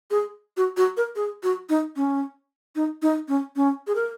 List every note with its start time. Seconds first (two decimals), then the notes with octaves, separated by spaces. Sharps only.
0.11 G#4
0.57 F#4
0.77 F#4
0.97 A#4
1.16 G#4
1.43 F#4
1.69 D#4
1.96 C#4
2.76 D#4
3.02 D#4
3.28 C#4
3.56 C#4
3.87 G#4
3.95 A#4